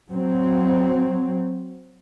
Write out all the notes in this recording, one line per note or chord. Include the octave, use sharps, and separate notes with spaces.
F#3 C4